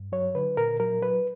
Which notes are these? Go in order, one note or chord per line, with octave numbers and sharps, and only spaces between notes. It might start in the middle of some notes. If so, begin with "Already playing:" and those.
Already playing: G2
F#3 C#5
D3 B4
A#2 A#4
F#3 A#4
F#3 B4